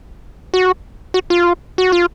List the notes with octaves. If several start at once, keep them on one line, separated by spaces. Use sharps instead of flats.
F#4
F#4
F4
F#4
F4